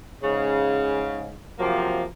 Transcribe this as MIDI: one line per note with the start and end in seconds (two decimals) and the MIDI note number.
0.22 1.37 44
0.22 1.37 49
1.59 2.04 48
1.59 2.04 53
1.59 2.04 54
1.59 2.04 58